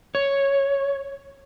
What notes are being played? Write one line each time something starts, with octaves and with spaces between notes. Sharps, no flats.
C#5